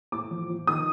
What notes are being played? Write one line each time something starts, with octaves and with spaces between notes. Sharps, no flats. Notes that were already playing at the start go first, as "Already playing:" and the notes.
A2 D6
F3
F3
D#3 D#6